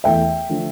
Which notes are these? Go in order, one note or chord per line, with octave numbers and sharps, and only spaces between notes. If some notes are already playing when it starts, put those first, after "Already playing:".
E2 E3 A3 E5 G5
D3 F3 A3